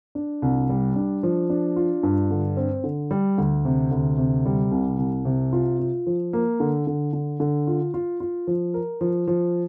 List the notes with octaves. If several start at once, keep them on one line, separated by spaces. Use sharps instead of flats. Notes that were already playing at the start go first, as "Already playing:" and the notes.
D4
C2
G3
D4
F3
D4
F4
G2
D3
C4
D3
G3
D2
C3
D2
C3
G3
C2
C2
C3
F4
F4
F3
A#3
D3
D3
D3
D3
F4
F4
F4
F3
A#4
F3
F3